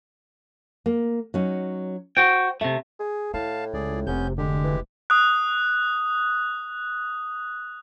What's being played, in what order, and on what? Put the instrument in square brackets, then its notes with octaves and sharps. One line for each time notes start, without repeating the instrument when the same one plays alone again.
[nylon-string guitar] A#3
F#3 C#4 D#4
[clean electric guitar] F#4 G5 [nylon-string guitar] C5
[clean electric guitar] C3 A3 [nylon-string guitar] E5
[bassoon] G#4
[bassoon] A2 [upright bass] E4 [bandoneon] F5 A5
[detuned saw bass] C#2 [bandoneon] G#4 D5
[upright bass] F1 [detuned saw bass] C3 [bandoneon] B3 C#4 G6
[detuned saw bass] D3 [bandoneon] G#3 G4
[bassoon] E3
[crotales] D#6 F#6